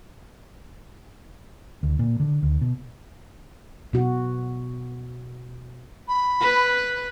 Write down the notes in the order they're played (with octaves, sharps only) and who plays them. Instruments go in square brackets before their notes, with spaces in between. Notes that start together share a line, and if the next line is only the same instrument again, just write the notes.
[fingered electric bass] D2
A#2
D3
D2
B2
[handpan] B2 F#4
[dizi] B5
[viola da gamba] B4